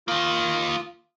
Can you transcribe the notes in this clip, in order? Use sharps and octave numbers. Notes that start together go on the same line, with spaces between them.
D#3 A#3 F4 D#6